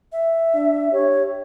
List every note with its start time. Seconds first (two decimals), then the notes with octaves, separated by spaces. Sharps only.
0.12 E5
0.54 D4
0.93 G4 C#5